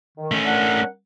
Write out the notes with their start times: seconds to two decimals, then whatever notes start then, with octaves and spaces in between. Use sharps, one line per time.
0.18 D#3
0.31 A3 C#4
0.45 D4 A#4 F#5